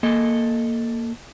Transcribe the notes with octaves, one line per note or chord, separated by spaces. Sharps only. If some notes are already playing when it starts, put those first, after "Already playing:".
A#3 A4 D#5